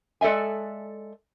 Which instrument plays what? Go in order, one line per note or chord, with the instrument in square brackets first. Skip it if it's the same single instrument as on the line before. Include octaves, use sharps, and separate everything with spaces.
[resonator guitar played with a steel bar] G#3 A4 D5 E5 G#5